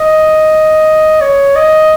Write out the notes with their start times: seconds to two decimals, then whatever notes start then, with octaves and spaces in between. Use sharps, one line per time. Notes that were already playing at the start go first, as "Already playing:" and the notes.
Already playing: D#5
1.21 C#5
1.56 D#5